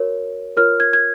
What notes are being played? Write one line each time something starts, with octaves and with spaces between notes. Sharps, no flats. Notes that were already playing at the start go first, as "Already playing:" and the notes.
Already playing: F#4 A#4 C#5
F4 A#4 C#5 F6
G#6
G#6